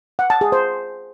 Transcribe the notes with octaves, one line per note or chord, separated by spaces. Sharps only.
F#5
A5
G#4
C5